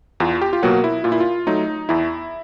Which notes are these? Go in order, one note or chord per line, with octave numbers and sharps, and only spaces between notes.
E2 F4
G4
F4
B2 F#3 A#3 F#4
E4
A#2 F4
E4
F4
F#3 A3 D#4
E2 E4